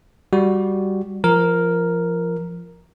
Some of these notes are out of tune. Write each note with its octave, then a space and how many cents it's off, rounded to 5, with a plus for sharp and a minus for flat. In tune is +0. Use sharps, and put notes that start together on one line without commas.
G3 +0 F#4 +0
F3 -20 A#4 +0